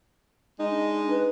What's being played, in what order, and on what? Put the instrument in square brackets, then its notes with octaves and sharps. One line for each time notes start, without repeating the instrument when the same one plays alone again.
[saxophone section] G#3 D#4
[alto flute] D4
B4